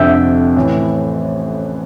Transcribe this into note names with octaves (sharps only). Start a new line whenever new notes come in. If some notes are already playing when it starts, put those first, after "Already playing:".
Already playing: F1 F2 D3 E5 G5
A1 A2 E3